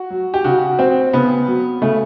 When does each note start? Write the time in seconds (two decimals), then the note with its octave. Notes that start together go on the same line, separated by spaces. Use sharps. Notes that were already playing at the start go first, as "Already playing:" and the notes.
Already playing: F#4
0.10 F#3
0.34 G4
0.44 C#3 F#4
0.79 F#3 C4
1.13 C#3 B3
1.47 F#3
1.81 C#3 A3